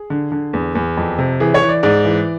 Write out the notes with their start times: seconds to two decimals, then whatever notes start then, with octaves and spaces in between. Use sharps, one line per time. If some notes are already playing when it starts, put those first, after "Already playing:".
Already playing: G#4
0.10 D3
0.32 D3
0.53 E2
0.75 E2
0.97 F2
1.19 C3
1.40 E3 G#4
1.54 C#5
1.62 E3
1.69 D5
1.83 G#2 D5
2.05 E3